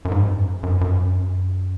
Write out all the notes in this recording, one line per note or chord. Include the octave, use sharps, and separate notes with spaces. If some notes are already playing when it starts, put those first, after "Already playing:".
F#2
G#2
F#2
F2
F#2
F#2